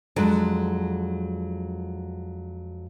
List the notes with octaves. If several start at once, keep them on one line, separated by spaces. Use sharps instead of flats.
F2 F#3 G#3 D4